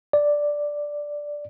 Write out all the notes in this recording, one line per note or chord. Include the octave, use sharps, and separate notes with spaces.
D5